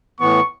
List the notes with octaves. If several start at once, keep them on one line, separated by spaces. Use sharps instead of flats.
A2 E3 B3 C#6